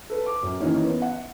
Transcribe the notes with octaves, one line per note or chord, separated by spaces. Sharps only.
A4 B4
D6
F#2
D#3 E3 A#3 C#4 D#4
B3
F#5